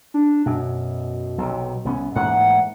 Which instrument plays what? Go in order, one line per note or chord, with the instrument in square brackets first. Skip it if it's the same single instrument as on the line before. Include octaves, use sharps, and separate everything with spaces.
[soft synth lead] D4
[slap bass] F#2 [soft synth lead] B2
[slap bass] B1 C3
C2 B3 C#4
[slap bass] A1 G#2 A#3 [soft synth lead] F#5